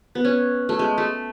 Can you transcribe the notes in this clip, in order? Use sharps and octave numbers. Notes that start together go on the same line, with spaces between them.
B3
C#4
A3
G#3
A3